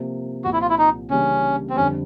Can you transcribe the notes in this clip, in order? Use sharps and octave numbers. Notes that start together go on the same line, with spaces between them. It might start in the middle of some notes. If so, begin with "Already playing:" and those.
Already playing: C3 F3 A#3
C2 A#2 F3 F#4
E4
F4
E4
D#4
C#3 E3 G3 A#3 C#4 D4
C4
F2 D3 G3 C#4